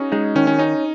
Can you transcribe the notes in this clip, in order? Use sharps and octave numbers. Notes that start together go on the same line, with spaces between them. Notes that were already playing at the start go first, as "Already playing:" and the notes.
Already playing: C#4 D#4 F#4 G#4
G#3 D#4
D#3 C#4
C#4
C#4 D#4